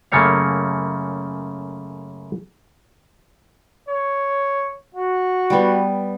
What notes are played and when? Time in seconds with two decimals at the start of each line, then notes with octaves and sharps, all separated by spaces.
0.12 F#2 C#3 A3 A#3 C#5 F5
3.89 C#5
4.95 F#4
5.50 G3 B3